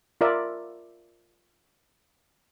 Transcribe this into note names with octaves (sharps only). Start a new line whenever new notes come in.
F4 A#4 D5 E5